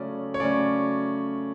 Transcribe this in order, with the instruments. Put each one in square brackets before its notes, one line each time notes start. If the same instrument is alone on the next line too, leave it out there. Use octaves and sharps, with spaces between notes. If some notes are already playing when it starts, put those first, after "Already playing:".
Already playing: [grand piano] C#3 F#3 A3 C#4 D5
C#5
C#3 F#3 A3 C#4 D5